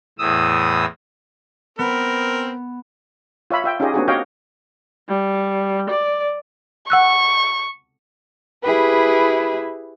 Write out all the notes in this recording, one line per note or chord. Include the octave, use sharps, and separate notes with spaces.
E2 A2 D#6 E6
B3 C4 A#4
F4 C#5 E5 B5
F4 E5 G5
C#4 D#4 F4 G4 G#4 D#5
A#3 C4 D4 F#4 G#4
F#4 G4 C#5 D#5 F5 G5
G3
D5
F#5 C#6 E6 F#6
E4 G4 G#4 B4